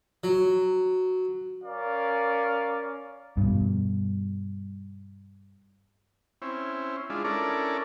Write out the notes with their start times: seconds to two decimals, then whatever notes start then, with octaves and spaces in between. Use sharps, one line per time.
0.24 F#3
1.63 C#4 A#4 D5 F5
3.37 G2 B2
6.42 C4 C#4 E4
7.10 G#3 D4 E4 F4
7.24 C#4 D4 E4 A4 A#4 D5